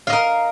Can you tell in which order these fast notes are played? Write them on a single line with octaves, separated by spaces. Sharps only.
F5 D#5 A#4